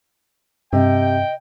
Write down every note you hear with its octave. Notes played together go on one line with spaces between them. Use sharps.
G2 C3 D#5 G5